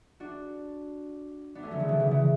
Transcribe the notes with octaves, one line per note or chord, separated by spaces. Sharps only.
D4 F#4
B3 D4
A3 C#4
D3 F#3
C#3 E3
B2 D3
C#3 E3
C#3 E3